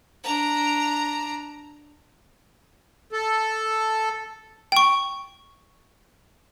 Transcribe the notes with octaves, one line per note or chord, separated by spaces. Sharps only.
D4 A#5
A4
G5 C#6